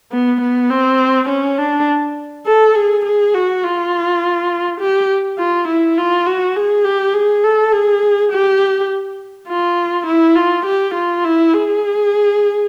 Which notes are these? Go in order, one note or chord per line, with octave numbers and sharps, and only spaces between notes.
B3
B3
C4
C#4
D4
A4
G#4
G#4
F#4
F4
G4
F4
E4
F4
F#4
G#4
G4
G#4
A4
G#4
G4
F4
E4
F4
G4
F4
E4
G#4